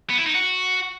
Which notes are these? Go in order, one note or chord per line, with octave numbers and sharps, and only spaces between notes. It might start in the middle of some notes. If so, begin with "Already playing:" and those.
B3
E4
D#4
F#4